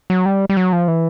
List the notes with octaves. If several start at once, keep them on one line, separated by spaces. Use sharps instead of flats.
F#3
G3
G3
F#3
F3
E3